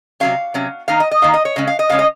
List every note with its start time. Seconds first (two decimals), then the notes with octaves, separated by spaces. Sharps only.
0.20 C3 F#3 C#4 F5
0.54 C3 F#3 C#4
0.88 D#3 A#3 D#4 F5
1.00 D#5
1.11 D#5
1.22 D#3 A#3 D#4 F5
1.34 D#5
1.45 C#5
1.56 C#3 G#3 C#4 D#5
1.67 F5
1.79 D#5
1.89 C#3 G#3 C#4 F5
1.99 D#5